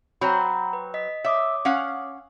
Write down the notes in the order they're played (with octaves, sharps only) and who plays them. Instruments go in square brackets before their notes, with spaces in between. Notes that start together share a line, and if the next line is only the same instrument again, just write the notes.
[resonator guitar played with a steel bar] F#3 C4 [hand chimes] F#5 A#5 B5
[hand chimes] B4
D#5 B6
[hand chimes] C#5 D6 D#6 [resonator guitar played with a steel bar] E5
[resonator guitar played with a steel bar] C#4 F5 F#5